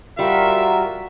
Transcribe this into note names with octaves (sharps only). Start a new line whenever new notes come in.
G3 F4 F#4 A#4 E5